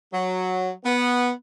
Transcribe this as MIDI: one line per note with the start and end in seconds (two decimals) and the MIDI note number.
0.12 0.70 54
0.84 1.31 59